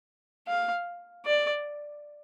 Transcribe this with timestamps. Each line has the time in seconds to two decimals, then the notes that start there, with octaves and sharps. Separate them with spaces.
0.47 F5
1.25 D5